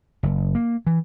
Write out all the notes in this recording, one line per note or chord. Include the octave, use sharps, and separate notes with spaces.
F#1
A#3
E3